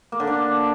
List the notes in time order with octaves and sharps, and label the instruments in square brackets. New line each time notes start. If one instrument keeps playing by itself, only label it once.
[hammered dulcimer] A#3
D3
D4